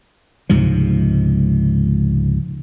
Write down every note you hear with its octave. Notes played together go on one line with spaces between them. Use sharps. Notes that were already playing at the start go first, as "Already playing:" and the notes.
C#2 G#2 C3 F3